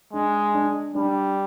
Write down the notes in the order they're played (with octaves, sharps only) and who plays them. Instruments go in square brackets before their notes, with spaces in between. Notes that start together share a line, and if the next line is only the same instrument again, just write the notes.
[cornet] G#3 [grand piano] D4
[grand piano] D4
[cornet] G3 [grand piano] D4